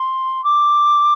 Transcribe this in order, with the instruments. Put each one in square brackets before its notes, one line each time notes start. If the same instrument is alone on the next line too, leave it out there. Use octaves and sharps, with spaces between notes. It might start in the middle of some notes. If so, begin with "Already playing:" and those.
Already playing: [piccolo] C6
D6